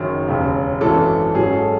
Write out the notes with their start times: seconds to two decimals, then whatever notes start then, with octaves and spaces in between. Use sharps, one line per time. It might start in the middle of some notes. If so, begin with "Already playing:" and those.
Already playing: F#1 F#2 D#3 C#5
0.27 E1 D#2 C#3
0.81 G#1 F#2 E3 A4
1.34 G#2 F#3 C#4 G#4
1.53 A4